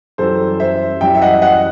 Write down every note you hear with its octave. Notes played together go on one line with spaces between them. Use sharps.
F#2 E3 G3 A4 C5
C5 E5
F#2 E3 G3 E5 G5
E5
D#5 F#5
D#5 F#5